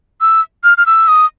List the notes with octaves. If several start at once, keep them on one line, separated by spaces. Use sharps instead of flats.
E6
F6
F6
E6
D#6